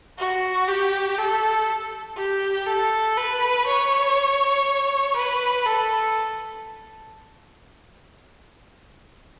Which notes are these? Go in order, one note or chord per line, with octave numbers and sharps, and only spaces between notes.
F#4
G4
A4
G4
A4
B4
C#5
B4
A4